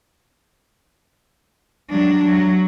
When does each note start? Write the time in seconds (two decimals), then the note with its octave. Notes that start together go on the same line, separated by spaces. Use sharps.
1.90 F#3 D4
2.25 F#3